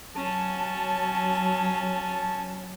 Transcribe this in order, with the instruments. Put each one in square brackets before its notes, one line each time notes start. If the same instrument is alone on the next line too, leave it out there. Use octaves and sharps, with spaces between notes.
[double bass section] F#3 [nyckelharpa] C#4 [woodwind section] A5